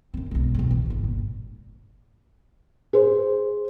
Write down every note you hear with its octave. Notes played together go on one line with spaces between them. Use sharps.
F#2 C4
B1 G#3
B1 G#2
E3 G#3
G1 G#2
A#2
G#4 C5